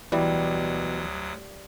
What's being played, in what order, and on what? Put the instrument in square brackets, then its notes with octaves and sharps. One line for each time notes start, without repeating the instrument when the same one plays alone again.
[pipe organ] D2 F#3 D#6 [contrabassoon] B2 [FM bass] E3 [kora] G3